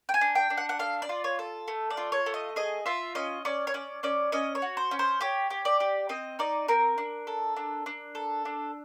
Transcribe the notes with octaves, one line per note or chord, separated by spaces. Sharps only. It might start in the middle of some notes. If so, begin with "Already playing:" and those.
G5
G#5
D4
G5
D4
F#5
F#5
A4 F5
D5
F4
C#5
A4
A3
D5
F4
C#5
A3
D#5
G#4 D#5
F4 E5
C#4 D#5
C#4 D5
C#5
C#4 D5
C#4 D5
C#4 D#5
C#5
F#4
C5
C#4
C5
G4 C#5
G4
D5
G4
C4 D#5
D#4 D5
C4 A#4
D4
A4
D4
D4
A4
D4